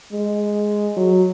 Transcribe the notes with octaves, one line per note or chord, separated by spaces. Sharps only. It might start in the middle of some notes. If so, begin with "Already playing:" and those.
G#3
F#3